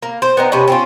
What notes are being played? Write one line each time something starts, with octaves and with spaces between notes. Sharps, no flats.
A#3
C5
B3 C4 D#4
C3 B3 C#4
C4 C#4 F4